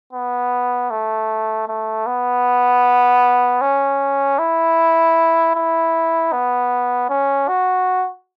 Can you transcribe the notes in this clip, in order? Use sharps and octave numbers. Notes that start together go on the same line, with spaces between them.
B3
A3
A3
B3
C#4
E4
E4
B3
C#4
F#4